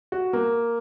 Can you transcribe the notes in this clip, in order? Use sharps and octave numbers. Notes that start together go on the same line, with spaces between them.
F#4
A#3